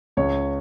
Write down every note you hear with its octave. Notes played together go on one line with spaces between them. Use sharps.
C#2 C#5